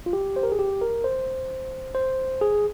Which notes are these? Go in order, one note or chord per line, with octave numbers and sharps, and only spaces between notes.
F4
G4
C5
A#4
G#4
G4
A#4
C5
C5
G#4